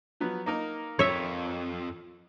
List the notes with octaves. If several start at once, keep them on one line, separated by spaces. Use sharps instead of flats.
F3 F#3 B3
A#3 D#4 A#4
F2 C#5 E5